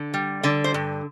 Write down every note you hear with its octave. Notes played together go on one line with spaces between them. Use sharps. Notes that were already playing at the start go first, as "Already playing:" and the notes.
Already playing: D3
G3
D3 D5
C5
G2